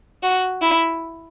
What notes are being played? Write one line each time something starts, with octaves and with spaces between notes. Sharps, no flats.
F#4
E4